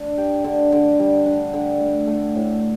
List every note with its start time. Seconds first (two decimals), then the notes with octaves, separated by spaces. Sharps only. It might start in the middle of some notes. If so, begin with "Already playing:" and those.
Already playing: D4
0.18 G4
0.44 D3
0.72 D3
1.00 G3
1.26 D4
1.54 D3
1.80 A3
2.07 A3
2.35 A2